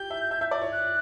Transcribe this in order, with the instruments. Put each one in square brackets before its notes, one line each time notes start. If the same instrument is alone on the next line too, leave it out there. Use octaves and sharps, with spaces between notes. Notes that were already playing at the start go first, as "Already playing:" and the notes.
Already playing: [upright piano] G4 [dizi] G6
[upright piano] E5
E5
E5
D5
C#5
[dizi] F#6